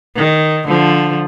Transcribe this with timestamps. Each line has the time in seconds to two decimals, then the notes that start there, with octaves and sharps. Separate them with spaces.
0.16 D#3
0.68 D3 F3